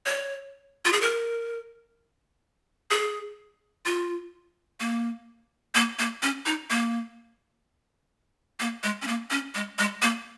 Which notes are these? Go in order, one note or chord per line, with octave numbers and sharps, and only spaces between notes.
C#5
F4
G#4
A#4
G#4
F4
A#3
A#3
A#3
C#4
D#4
A#3
A#3
G#3
C#4
A#3
C#4
G#3
G#3
A#3